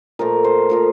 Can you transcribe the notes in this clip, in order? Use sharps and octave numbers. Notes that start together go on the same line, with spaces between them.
A#2 F3 A3 A#4
C5
A#2 F3 A3 A#4